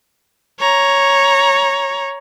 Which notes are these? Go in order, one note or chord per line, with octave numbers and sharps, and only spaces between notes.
C#5 A#5